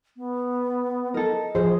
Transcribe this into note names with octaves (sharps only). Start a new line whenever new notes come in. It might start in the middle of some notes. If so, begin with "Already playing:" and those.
B3
A4 A#4 D#5
F3 G#4 C5